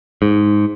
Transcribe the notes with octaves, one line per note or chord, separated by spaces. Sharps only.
G#2